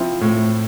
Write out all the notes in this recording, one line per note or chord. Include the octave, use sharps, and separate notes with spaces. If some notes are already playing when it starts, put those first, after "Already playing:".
Already playing: F3 C4 E4
A2